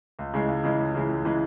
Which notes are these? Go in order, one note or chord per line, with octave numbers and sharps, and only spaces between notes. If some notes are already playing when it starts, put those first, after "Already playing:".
C#2
C#3 E3 G#3
C#2
C#3 E3 G#3
C#2
C#3 E3 G#3
C#2
C#3 E3 G#3